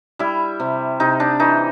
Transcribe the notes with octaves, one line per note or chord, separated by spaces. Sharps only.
G3 E4
C3
C3 D#4
D4
E3 D#4